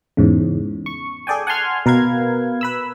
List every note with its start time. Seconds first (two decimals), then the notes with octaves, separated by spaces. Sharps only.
0.17 E2 G#2 C#3
0.86 C#6
1.27 G#4 A4 D5 G5 G#5
1.47 F#5 G#5 A5 C6 F6 G#6
1.86 B2 A#4 B4 F5 G#6
2.61 B4 B5 E6